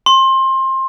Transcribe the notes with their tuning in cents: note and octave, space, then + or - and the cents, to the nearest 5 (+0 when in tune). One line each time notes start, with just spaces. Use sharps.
C6 +25